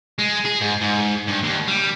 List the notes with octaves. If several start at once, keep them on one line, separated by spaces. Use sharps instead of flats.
G#3
G#4
G#2
G#2
G2
D#2
G3